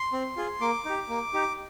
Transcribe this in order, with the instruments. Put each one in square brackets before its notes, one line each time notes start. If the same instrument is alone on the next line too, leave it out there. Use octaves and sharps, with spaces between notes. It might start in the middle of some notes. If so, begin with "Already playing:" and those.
Already playing: [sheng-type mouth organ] C6
C4
F4 G#4
A#3 D6
D#4 G4
A#3
D#4 G4